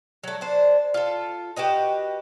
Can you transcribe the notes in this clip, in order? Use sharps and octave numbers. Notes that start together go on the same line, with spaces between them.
F#3 A3
D4 C5
F4 A4
F#4 G4 B4 D#5